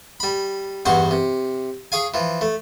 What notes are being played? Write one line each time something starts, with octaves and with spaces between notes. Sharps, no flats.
G3 B5
E2 G2 F#4 C5 C#6
C3
G#4 C#5 F5 G#5
E3 F3
A3